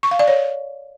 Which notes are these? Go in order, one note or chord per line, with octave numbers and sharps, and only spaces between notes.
C#6
F5
D5
C#5